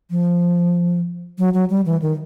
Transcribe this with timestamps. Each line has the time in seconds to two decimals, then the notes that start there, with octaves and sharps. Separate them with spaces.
0.11 F3
1.39 F#3
1.54 F#3
1.70 G3
1.86 E3
2.02 D#3